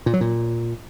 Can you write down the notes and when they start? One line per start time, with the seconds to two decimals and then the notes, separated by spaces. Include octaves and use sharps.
0.06 A#2
0.13 F#3
0.21 A#2